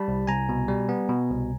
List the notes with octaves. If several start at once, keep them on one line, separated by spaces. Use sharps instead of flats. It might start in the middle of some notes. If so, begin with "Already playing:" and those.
Already playing: G3 A5 B5
C2
C2 G#5 A#5
B2
G3
B3
B2
C2